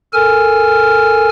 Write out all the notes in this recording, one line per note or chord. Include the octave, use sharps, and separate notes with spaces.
A4 A#4 G#5 F6